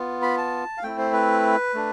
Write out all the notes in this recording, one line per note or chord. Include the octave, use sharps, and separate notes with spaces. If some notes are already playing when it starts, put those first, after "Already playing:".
Already playing: B3 F4
B5
A5
F5
A3 C4 E4 G5
C5
B4
A3 D4